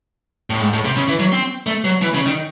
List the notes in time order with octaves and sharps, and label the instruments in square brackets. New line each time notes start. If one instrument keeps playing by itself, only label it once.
[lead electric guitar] A2
G#2
A2
C3
C#3
E3
F#3
C4
A3
F#3
E3
C#3
D#3